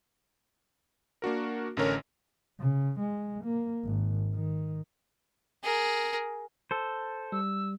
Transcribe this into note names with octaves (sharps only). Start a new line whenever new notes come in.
A#3 D4 F#4 A#4
A1 D3 C#4 A#4 C#5
C#3
G#3
A#3
G#1
D#3
G#4 A#4
A4 C5
G3 E6